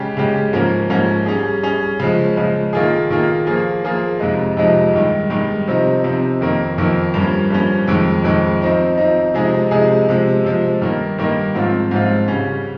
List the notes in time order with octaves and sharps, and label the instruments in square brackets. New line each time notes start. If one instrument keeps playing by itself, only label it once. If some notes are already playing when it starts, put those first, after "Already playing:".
Already playing: [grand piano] C#3 G#3 C#4 G4
C#3 G#3 C#4 G4
G#2 F3 A#3 C#4
G#2 F3 A#3 C#4
G3 C#4 G#4
G3 C#4 G#4
C#3 F3 G#3
C#3 F3 G#3
D#3 A#3 F4 G#4
D#3 A#3 F4 G#4
F3 A#3 F4 G#4
F3 A#3 F4 G#4
F2 C3 F3 G#3 D#4
F2 C3 F3 G#3 D#4
G2 D#3 G#3
G2 D#3 G#3
C3 F3 C4 D#4
C3 F3 C4 D#4
F2 D#3 A#3
F2 D#3 A#3
G2 F3 A#3 C#4
G2 F3 A#3 C#4
F2 D#3 G#3
F2 D#3 G#3
F3 C4 D#4
F3 C4 D#4
C3 F3 G#3 D#4 G#4
C3 F3 G#3 D#4 G#4
C3 F3 G#3
C3 F3 G#3
G2 D#3 A#3
G2 D#3 A#3
G#2 F3 C4 F4
G#2 F3 C4 F4
C#3 G3 C#4